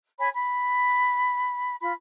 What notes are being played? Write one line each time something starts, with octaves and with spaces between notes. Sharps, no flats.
C#5 G#5 B5
B5
F4 B5